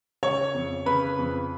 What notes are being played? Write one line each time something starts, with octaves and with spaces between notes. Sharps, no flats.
C#3 C#5 C#6
F2
C#3 B4 B5
F2